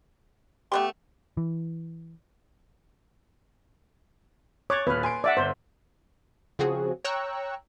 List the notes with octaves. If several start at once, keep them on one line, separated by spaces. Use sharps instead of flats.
A3 B3 G4 C6
E3
C#5 D6 F#6 A6
D#1 B4 F6
G#5 C6 D7
D5 E5 F#5
G1 C5
C#3 F3 C4 F#4 G#4
C#5 G5 A#5 C#6 E6 F#6